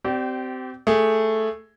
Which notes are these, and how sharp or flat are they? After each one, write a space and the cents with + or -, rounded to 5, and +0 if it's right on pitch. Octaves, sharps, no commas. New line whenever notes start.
C4 -20 G4 -35 D5 +0
A3 +0 G#4 +0